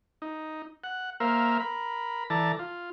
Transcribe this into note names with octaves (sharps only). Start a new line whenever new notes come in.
D#4
F#5
A#3 A#4 C5 E5 F5
A#4 B5
E3 A4 D5 A5 A#5
F4